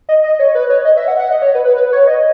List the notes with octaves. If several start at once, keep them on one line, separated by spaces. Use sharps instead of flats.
D#5
D#5
C#5
B4
C#5
D#5
E5
F#5
F#5
D#5
C#5
B4
B4
B4
C#5
D#5